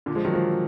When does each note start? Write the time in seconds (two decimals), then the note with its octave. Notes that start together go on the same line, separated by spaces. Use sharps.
0.06 A#2 D3
0.15 F3 G#3
0.25 D#3 F#3
0.33 F3 G#3